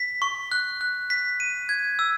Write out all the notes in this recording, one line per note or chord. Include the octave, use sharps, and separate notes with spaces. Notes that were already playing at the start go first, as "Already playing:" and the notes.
Already playing: B6
C#6
F#6
F#6
B6
D#7
G#6
E6